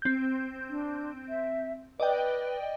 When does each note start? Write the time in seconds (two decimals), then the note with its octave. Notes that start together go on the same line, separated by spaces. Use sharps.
0.02 C4 G6
0.69 D4
1.29 E5
2.00 B4 D5 D#5 G5